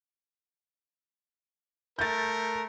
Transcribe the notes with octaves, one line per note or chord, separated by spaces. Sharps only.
A3 A#4 G6 A6